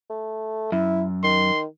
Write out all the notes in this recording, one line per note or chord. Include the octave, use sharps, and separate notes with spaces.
A3
F#2 E4
D#3 C6